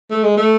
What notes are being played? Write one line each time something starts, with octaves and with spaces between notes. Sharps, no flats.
A3
G#3
A3